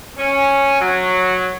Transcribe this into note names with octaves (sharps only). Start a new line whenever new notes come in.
C#4
F#3